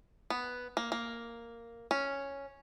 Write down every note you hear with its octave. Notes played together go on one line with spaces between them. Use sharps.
B3
A#3
A#3
C#4